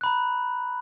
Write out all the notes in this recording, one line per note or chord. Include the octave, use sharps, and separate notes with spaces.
A#5 B5 F#6